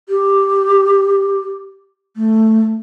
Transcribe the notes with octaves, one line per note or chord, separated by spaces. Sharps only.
G4
A3